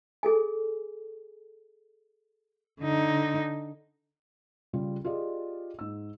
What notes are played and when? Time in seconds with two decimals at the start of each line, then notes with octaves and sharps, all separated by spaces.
0.23 G#4 A4 G#5
2.81 D3 D#4
4.73 C#3 G3 F4
5.05 F4 G4 G#4 D5 D#5
5.79 G#2 E6